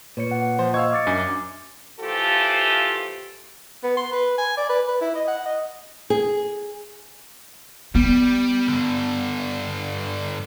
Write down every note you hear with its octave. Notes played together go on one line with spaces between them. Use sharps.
A#2 B4 C#5 C#7
F#5
F3 C5
D#5 F5 C#6 E6 G#6
D6 A6 C#7
F#2 D4 G#5
E3 F3 A3 F4 G4 A4
B3
C6
B4
G#5
D5
B4
B4
E4
D#5
F#5
D#5
G#4
G3 B3
G2 D3